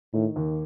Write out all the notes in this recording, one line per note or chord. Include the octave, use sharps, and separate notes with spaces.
A2 D#3
D#2